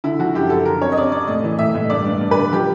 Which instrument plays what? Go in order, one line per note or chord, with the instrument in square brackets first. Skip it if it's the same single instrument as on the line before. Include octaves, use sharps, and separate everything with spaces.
[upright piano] D3 E4
F3 F#4
F#2 G4
F#2 A4
D3 A#4
F2 C#5
D#5
F2 D5
F2 D5
A2 D#5
E3
A2 E5
A2
G2 D5
G2
G2
B4
D3
F3 G4